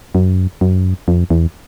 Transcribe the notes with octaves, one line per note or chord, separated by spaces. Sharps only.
F#2
F#2
F2
E2